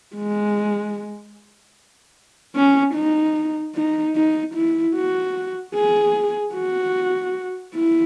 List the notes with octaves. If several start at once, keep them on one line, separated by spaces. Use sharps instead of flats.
G#3
C#4
D#4
D#4
D#4
E4
F#4
G#4
F#4
E4